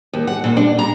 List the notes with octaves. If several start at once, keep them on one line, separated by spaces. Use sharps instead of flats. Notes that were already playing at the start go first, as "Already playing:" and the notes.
D#2
F#5
A#2
D4
A#5